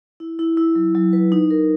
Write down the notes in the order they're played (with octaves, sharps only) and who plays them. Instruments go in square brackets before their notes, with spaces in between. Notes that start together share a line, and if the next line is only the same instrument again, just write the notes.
[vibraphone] E4
E4
E4
F#3
F#3
B4
D#4
A#4